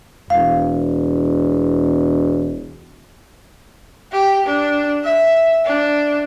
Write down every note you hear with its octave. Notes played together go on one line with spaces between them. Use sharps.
E1 F5
G4
D4
E5
D4